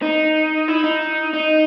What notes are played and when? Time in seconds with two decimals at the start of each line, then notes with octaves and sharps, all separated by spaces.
0.02 D#4
0.68 E4
0.84 D#4
1.34 D#4